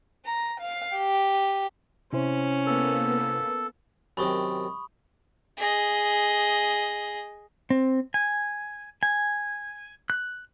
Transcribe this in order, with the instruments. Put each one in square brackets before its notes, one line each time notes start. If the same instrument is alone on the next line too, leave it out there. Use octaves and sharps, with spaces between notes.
[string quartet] A#5
F5
G4
[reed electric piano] C3 E4 C5 [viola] C#4
[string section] A#3 B3 [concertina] A4
[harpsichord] F#2 C3 D#3 [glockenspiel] B5 C#6 D#6
[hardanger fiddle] G#4 D#5
[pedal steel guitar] C4
G#5
G#5
F#6